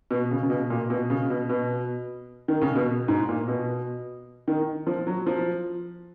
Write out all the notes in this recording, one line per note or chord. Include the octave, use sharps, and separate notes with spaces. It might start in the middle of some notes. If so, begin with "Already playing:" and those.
B2
C#3
C#3
B2
A#2
B2
C#3
B2
B2
D#3
C#3
B2
G#2
A#2
B2
D#3
F3
F#3
F3